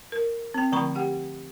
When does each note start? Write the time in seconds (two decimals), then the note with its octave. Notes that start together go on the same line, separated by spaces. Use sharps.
0.12 A#4
0.54 C4 G5
0.72 D3 F3 A3 A#5 B5 C#6
0.95 G4 F#5 G5